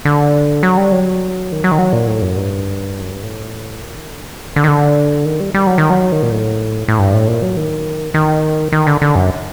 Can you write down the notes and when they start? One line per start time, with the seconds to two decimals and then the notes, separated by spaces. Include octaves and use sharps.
0.05 D3
0.63 F#3
0.77 G3
0.92 F#3
1.52 D#3
1.64 F#3
1.72 D#3
1.79 F#3
1.93 A#2
2.07 A2
2.22 F#2
2.37 G2
3.01 F#2
3.12 G2
3.23 A2
3.81 A#2
3.95 D#3
4.10 D3
4.24 C3
4.39 D3
4.48 D#3
4.56 D3
4.64 D#3
4.68 D3
5.25 D#3
5.40 G3
5.54 G3
5.67 F#3
5.78 D#3
5.90 F#3
6.12 D#3
6.23 A#2
6.32 A2
6.88 A2
6.99 G2
7.14 A2
7.28 A#2
7.42 F#3
7.57 D#3
8.14 D#3
8.72 D#3
8.87 D3
9.02 D3
9.15 F#2